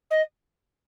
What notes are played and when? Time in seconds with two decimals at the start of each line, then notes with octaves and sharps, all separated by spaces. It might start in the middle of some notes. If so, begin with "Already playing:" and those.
0.10 D#5